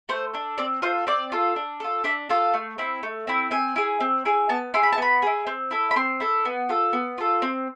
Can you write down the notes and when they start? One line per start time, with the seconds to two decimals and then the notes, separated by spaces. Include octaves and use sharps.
0.09 A3 C5
0.34 D4 A4
0.58 C4 D5
0.82 F4 A4 C5
1.07 C4 D5
1.32 F4 A4
1.56 D4
1.80 F4 A4
2.04 D4 E5
2.29 F4 A4 F5
2.54 A3
2.78 C4 E4
3.03 A3
3.27 C4 E4
3.51 C4 G#5
3.76 E4 G#4
4.00 C4
4.25 E4 G#4
4.49 B3 A5
4.74 E4 G#4 C6
4.83 B5
4.92 A5
4.98 B3 B5
5.22 E4 G#4
5.47 C4
5.71 E4 A4
5.91 B5
5.96 C4 C6
6.20 E4 A4
6.45 B3
6.69 F4 A4
6.93 B3
7.18 F4 A4
7.42 C4